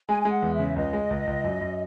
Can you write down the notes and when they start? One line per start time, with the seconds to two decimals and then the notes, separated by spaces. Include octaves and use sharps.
0.08 G#3 G#5
0.22 G#3 G#5
0.31 F#5
0.42 E2
0.54 E5
0.59 C#3
0.76 C#2 D#5
0.93 G#3
1.10 C#2
1.27 C#2
1.44 F#2
1.61 F#2